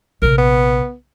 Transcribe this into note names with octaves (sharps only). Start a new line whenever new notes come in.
A#1 C3 A#4
B3